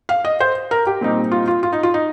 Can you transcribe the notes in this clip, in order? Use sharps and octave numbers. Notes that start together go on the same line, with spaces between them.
F5
D#5
C5
A#4
G4
A#2 G3 C4 D#4
F4
F4
F4
D#4
F4
D#4